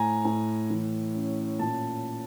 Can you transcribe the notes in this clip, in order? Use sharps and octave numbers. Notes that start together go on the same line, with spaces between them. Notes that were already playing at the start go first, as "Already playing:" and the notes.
Already playing: A2 G#5 A#5
A2
E3
C#4
A#2 A5